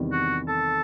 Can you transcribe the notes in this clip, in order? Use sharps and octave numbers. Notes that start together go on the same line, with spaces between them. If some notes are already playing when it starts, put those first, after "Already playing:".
Already playing: E2 C3 D#3 G3
F#4
A4